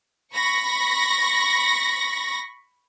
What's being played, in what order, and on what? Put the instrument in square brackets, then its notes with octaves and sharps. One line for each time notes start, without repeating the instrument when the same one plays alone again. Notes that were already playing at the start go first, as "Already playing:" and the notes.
[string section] B5 C#6 A#6